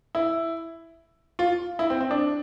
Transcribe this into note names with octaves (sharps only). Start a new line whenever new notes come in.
E4
F4
E4
C4
C4
D4